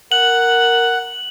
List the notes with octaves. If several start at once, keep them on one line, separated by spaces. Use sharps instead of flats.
A#4 F#5 F#7